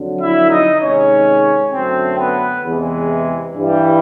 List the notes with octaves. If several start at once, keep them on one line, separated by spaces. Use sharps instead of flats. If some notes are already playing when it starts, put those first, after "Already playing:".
Already playing: F2 D3 F#3
E4 E5
D#4 D#5
C3 D#3 G#3 C#4 C#5
F#2 D3 F#3 A3 C4 C5
B3 B4
E2 C3 E3 G#3
G2 E3 G3